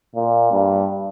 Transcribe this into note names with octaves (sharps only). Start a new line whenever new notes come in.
A#2
G2